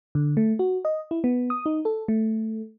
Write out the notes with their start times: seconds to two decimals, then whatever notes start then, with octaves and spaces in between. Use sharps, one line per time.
0.15 D3
0.37 A3
0.59 F#4
0.85 D#5
1.11 E4
1.24 B3
1.50 D#6
1.66 D#4
1.85 A4
2.08 A3